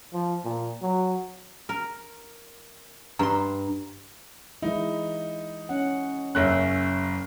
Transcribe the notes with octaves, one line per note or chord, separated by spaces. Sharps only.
F3
A#2
F#3
A#4
G2 A#5 C6
E3 G#3 D#4 E4
C#4 F#5
F#1 C#4 E5 F#6